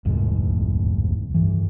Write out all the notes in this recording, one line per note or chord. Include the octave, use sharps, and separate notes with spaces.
D1 C2 F2 G#2
G2 E3